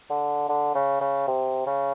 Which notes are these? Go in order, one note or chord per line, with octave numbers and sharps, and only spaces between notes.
D3
D3
C#3
C#3
C3
C#3